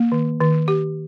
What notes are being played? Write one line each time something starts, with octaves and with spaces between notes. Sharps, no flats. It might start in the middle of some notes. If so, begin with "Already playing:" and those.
Already playing: A#3
D#3
D#3
G4